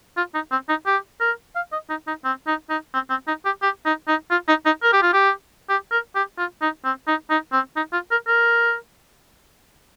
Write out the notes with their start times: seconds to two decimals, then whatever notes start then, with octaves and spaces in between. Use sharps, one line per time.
0.17 F4
0.34 D#4
0.51 C4
0.69 D#4
0.86 G4
1.21 A#4
1.55 F5
1.72 D#5
1.89 D#4
2.07 D#4
2.24 C4
2.47 D#4
2.70 D#4
2.94 C4
3.10 C4
3.27 D#4
3.45 G4
3.62 G4
3.85 D#4
4.08 D#4
4.31 F4
4.48 D#4
4.66 D#4
4.83 A#4
4.93 G4
5.02 F4
5.13 G4
5.69 G4
5.91 A#4
6.15 G4
6.38 F4
6.61 D#4
6.85 C4
7.07 D#4
7.30 D#4
7.53 C4
7.76 D#4
7.93 F4
8.11 A#4
8.28 A#4